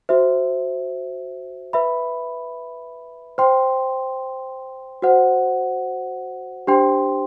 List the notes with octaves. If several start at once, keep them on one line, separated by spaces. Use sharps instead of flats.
F#4 C5 E5
B4 E5 B5
C5 G5 C6
F#4 C5 F#5
D4 G4 C5 G5 C6